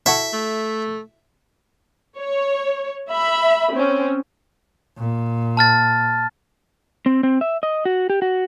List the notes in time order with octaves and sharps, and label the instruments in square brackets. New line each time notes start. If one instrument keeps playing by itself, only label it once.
[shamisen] E4 F#4 A4 [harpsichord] E5
[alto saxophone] A3
[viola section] C#5
E5 B5
C4 C#4
[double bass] A#2
[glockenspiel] A5 F6 A6
[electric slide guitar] C4
C4
E5
D#5
F#4
G4
F#4